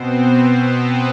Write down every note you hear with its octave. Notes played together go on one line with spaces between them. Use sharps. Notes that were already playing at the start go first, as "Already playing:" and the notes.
Already playing: B2 B3 C4 C5
B3 B4